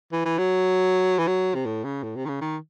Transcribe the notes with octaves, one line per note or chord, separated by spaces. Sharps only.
E3
E3
F#3
E3
F#3
C3
A2
C#3
A2
C3
D#3
C#3
D#3